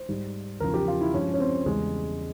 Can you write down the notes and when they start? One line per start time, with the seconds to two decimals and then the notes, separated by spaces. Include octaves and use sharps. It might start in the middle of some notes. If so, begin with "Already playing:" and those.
Already playing: C5
0.09 G#2 G3
0.60 E2 C#3 F3 A#4
0.74 G4
0.88 F4
1.01 E4
1.14 G2 F3 G#3 C#4
1.34 C#4
1.40 C4
1.66 E2 C#3 G3 G#3